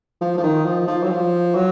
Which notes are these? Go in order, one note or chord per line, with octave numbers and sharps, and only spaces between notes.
F3
F3
D#3
F3
F3
F#3
F3
F#3